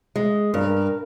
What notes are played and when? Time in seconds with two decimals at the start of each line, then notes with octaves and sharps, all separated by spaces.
0.16 G#3
0.53 G2 A#4